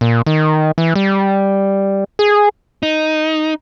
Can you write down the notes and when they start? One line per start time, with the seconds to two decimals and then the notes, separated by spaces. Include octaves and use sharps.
0.01 A#2
0.26 D#3
0.78 E3
0.96 G3
2.19 G#4
2.83 D#4